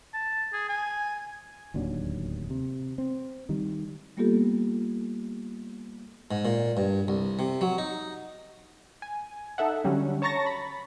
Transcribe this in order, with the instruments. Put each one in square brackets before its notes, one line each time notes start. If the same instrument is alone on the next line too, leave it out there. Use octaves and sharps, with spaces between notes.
[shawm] A5
G#4
G#5
[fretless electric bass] D1 D#2 F#3 D4
C3
C4
D#3 G3
[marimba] G3 A#3 B3 F4 G4 A4
[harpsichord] G#2
A#2
G2
C2
C3
F#3
D#4
[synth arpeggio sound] G#5
D#4 A4 E5 F#5
D3 F#3 G3 C#4
C#5 A5 A#5 C#6 A6 A#6
B5